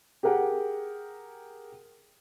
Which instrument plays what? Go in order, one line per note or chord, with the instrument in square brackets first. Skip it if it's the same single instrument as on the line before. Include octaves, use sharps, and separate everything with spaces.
[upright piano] G4 G#4 A#4 F#5 G5